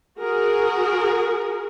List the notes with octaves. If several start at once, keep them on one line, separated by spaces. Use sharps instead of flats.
F#4 G#4 A#4